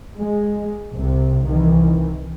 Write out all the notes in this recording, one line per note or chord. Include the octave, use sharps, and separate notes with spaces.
G#3
C2 C3
C2 D#3 E3